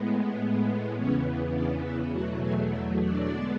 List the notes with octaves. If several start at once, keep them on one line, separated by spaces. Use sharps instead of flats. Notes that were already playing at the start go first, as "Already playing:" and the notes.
Already playing: A2 G#3 B3
E2 C#3 E3 B3 C#4 C#5
D4 D5
E4 E5
E2 B2 F#3 A3 F#4 F#5
G#4 G#5
E4 E5
D4 D5
D3 G#3 B3